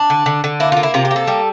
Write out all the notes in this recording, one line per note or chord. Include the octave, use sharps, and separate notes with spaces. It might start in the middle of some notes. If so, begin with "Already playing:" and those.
Already playing: D4
D3
D3
D3
A#3 E4
F4
A#3
E4
C3 F4
G4
A#3
A4
G3